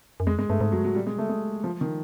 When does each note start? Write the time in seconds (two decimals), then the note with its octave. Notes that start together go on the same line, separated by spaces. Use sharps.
0.20 F#2
0.26 F2 G#3
0.38 G2 G#3
0.49 G2 A3
0.61 G#2 G#3
0.72 F#2 F#3
0.80 G2
0.84 F#3
0.88 G#2
0.95 A2 G3
1.07 A#2 G#3
1.18 C#3 A3
1.29 G#3
1.64 F3
1.81 D#3